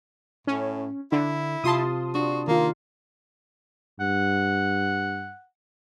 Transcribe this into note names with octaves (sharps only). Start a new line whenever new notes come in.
A2 C#4
D3 E4
C3 F4 A5 C6 D#6
D4 F#4
D#3 A#3 F4
G2 F#5